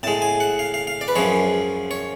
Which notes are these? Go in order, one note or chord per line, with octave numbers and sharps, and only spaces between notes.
A2 G#3 A5
G#5
F#5
F5
F5
F5
D5
B4
F#2 F3 G#3 C#5
C#5